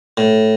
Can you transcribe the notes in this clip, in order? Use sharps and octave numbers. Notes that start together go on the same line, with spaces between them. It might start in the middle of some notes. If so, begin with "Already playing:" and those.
A2